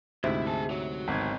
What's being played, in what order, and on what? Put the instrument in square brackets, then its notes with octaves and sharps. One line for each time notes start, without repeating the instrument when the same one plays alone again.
[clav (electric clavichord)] D2 G#2 C3 [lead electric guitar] E4 [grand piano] E5
[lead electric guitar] G#4 A5
F#4 C#5
[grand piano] G#1 G#6 [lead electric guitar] F#3 B3